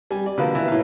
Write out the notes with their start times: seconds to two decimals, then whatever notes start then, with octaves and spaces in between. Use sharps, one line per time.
0.11 G3 G#5
0.26 D5
0.38 B2 D3 F3 G3 A#3 B4
0.55 E3 E4 B4
0.68 A2 F5